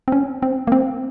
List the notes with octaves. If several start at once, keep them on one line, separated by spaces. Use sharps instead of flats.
C4
C#4
C4
A#3
C4